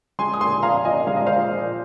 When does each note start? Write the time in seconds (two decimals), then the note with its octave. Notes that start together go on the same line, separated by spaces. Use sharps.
0.19 G#3 G#5 C6
0.34 D#6
0.41 A#2 G#5 C6
0.63 F3 F5 A#5
0.77 F5
0.85 A#2 D#5 G#5
1.07 G#3 F5
1.16 D#5
1.27 A#2 C5 F5
1.50 F3